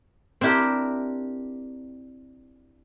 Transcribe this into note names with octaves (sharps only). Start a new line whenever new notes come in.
C4 D4 E4 G4 A#4